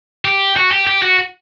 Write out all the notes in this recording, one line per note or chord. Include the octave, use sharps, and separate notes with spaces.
G4
F#4
G4
G4
F#4